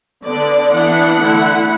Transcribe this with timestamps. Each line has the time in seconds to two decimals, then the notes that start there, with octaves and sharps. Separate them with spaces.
0.24 D3 B3 D4 D5
0.73 E3 B3 D4 F#5
1.22 D3 A3 E4